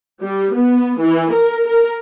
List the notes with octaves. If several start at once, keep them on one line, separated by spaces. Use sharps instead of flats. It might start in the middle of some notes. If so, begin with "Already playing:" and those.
G3
B3
E3
A#4
A#4